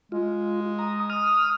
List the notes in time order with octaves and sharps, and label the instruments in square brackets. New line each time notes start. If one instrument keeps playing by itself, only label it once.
[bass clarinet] G#3 [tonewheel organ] F4
[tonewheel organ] A#5 D#6
D#6 F6